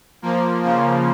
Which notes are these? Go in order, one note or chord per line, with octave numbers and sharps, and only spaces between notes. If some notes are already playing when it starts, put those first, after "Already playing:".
F3 A#3
C#3 F3